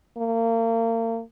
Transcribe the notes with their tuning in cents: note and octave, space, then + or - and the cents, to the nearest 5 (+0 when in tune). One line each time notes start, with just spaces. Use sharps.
A#3 -35